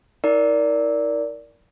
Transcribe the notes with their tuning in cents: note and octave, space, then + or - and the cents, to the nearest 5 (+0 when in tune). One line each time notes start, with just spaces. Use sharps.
D#4 +45 A#4 +0 D5 -15